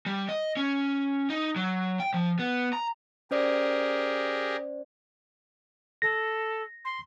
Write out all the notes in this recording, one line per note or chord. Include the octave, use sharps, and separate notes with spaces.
G3
D#5
C#4
D#4
F#3
G5
F3
B3
A#5
C#4 G4 G#4 A#4 C5 D5
A4 A#6
C6